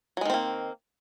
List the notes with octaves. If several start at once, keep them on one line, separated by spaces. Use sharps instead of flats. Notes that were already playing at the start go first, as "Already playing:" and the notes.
D#3 F#3 G#3 A#3 C4